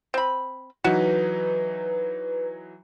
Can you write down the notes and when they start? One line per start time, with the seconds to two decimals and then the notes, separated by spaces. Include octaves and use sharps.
0.14 C4 B5
0.84 E3 F#3 D#4 F#4 B4